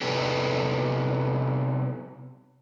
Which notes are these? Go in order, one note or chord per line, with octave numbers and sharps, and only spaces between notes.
C3 B3 D#4 G4 A4